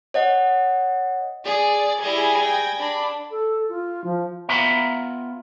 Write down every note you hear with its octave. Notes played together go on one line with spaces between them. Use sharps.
C#5 D#5 F#5
G#4 D5
G3 E4 G#4 G#5 G#6 A#6
G5
D4 D5 B5
A4
F4
F3
B3 F4 E5 A#5